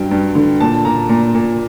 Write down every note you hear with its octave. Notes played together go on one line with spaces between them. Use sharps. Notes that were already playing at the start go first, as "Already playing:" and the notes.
Already playing: G2 F#3 G5
G2
D3
A#2 A5
A#2 A#5
A#2 A#5
A#2